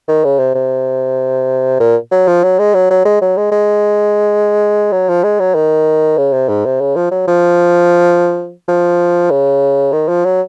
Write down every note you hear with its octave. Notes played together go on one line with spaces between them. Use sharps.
D#3
C#3
C3
C3
A#2
F#3
F3
F#3
G#3
F#3
F#3
G#3
F#3
G#3
G#3
F#3
F3
G#3
F#3
D#3
C#3
C3
G#2
C3
C#3
F3
F#3
F3
F3
C#3
D#3
F3
F#3